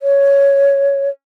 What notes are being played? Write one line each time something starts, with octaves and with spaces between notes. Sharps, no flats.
C#5